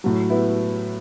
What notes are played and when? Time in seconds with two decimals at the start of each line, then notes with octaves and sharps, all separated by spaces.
0.04 A2 F#3
0.30 B3 E4